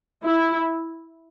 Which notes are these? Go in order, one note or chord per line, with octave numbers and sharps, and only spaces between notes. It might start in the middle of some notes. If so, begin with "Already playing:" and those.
E4